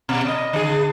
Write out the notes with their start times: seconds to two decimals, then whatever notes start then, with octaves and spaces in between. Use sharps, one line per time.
0.09 B2
0.28 D#5
0.53 D3 G#4